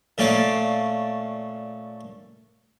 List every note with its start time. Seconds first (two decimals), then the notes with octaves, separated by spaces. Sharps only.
0.18 A#2 A3 C#4 D5 F5